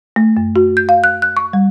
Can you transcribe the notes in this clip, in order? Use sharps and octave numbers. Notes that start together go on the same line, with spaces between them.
A3
F#2
F#4
G6
F5
F#6
F#6
C#6
G3